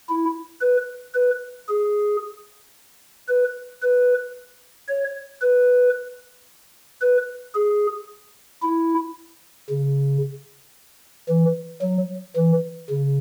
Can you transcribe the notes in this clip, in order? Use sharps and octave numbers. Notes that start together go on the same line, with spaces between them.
E4
B4
B4
G#4
B4
B4
C#5
B4
B4
G#4
E4
C#3
E3
F#3
E3
C#3